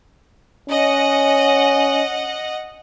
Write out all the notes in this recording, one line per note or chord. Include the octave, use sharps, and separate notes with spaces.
C#4 D#5 F#5